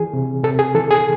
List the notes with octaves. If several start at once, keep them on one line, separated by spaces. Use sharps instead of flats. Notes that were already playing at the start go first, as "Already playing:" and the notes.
Already playing: E3 G#4
C3
C3 A4
G#4
E3 A4
G#4